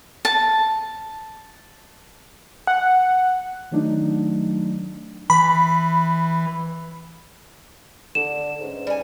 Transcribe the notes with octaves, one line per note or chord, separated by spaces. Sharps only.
A5
F#5
D#3 F#3 A3 D4 D#4
E3 B5
D3 D5 E7
G#2 C#4 B4 C#5
G3 G#5